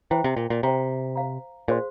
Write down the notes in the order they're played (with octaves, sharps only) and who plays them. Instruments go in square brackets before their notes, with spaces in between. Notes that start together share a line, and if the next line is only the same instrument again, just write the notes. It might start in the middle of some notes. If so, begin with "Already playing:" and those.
[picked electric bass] E3 [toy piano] C5 G5 A#5
[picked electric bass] C3
A#2
A#2
[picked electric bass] C3 [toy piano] C5 E5 G5 A#5
[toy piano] C5 F5 A#5
[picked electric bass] A#2 [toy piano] G#4 C5 F5 C6